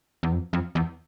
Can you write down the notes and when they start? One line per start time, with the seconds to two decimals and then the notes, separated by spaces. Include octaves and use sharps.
0.23 E2
0.32 F2
0.53 F2
0.75 E2